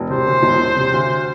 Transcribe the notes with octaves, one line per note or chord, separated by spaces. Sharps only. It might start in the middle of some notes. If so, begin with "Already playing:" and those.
Already playing: E1
C3 C5
D2
E1
E1
C3
D2